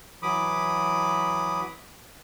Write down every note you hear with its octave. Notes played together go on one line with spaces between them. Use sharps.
E3 F#3 B5 D6 D#6